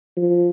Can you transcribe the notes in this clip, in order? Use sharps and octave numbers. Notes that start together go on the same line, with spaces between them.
F3